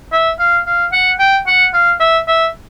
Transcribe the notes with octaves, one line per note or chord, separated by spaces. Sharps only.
E5
F5
F5
F#5
G5
F#5
F5
E5
E5